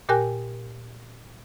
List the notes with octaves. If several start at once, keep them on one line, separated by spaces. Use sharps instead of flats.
A#2 G4 A#4 G5 G#5 F#6